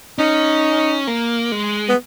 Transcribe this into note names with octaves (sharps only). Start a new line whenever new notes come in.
C#4 D#4
A#3
G#3
B3